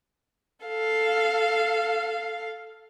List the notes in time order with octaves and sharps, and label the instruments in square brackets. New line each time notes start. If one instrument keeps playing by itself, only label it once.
[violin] A4 F5